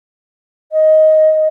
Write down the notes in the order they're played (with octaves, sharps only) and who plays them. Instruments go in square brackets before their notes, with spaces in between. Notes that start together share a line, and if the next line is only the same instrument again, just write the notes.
[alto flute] D#5